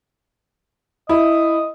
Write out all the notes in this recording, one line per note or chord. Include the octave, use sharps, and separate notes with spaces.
E4 D#5